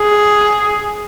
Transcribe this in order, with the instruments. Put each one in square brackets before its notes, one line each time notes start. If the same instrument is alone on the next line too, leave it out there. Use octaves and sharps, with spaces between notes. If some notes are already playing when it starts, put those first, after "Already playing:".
Already playing: [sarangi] G#4